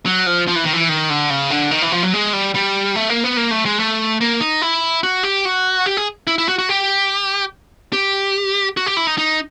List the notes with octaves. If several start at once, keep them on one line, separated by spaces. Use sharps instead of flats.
F#3
F3
F3
E3
D#3
E3
D#3
D3
C#3
D3
D#3
E3
F3
F#3
G#3
G3
G3
A3
A#3
B3
A#3
A3
G#3
A3
A#3
D#4
E4
F#4
G4
F#4
G4
G#4
E4
E4
F#4
F#4
G4
G4
F#4
G4
E4
D#4
D#4